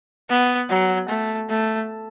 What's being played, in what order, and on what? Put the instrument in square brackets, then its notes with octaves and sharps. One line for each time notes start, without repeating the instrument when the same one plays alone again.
[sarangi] B3
F#3
A3
A3